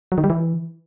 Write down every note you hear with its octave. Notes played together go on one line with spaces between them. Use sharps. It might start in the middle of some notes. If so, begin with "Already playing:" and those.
F#3
D#3
G3
E3